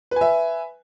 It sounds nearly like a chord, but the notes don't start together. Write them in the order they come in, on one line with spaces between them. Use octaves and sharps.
B4 G#5 E5